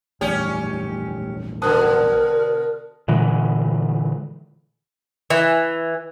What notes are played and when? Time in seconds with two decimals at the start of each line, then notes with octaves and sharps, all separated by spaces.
0.21 A#1 E3 G3 A3 C#4 G4
1.62 B2 D3 A#4 A5 D#6 F#6
3.08 A#2 D3 E3 G#3
5.30 E3